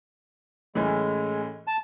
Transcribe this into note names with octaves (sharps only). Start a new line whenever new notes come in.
A2 E3 G#3 C#4
A5